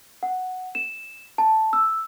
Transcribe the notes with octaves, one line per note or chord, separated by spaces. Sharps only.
F#5
E7
A5
E6